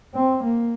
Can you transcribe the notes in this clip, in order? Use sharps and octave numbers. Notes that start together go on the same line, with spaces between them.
C4
A#3